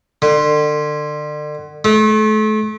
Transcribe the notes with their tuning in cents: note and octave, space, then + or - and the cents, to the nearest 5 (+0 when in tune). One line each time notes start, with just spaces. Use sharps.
D3 +35
A3 -35